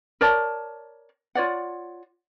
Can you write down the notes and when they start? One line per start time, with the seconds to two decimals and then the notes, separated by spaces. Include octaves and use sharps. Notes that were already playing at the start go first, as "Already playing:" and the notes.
0.21 A#4 C#5 D5 A5
1.35 F4 C#5 D5 F#5